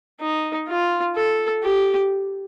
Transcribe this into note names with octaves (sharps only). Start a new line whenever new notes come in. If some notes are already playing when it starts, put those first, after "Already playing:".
D#4
F4
A4
G4